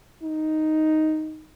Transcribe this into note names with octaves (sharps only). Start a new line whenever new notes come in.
D#4